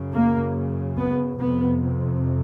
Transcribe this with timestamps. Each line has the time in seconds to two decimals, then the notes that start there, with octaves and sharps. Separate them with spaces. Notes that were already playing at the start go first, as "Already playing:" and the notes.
Already playing: F#2 C#3
0.13 A#3
0.97 B3
1.39 F2 C3 B3